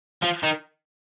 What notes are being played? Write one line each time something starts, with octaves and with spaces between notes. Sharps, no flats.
F3
D#3